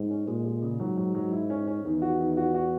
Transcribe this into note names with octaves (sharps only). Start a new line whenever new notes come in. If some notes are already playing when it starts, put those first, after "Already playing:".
Already playing: G#2
C#4
A#2 G#3
G#3
C#3
G#2 F#3
F#3
F#3
E4
C#4
C#4
E2 D#3
F#4
D#3
F#4
F#4